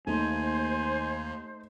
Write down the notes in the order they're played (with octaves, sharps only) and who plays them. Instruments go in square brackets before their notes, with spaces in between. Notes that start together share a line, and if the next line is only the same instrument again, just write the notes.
[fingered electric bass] D#2 A#3 [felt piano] A3 D#4 [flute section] C5 [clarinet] G#5